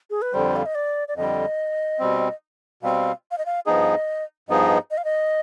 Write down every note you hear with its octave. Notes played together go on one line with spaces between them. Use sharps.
G#4
B4
F2 D3 G3 C5
F5
D#5
D5
D5
F2 D3 G3 D#5
B2 G3 C4
B2 G3 C4 F5
F5
D#5
F5
G2 F3 B3 D#4 G#4 D#5
G2 F3 B3 D#4 G#4 D#5
D#5
F5
D#5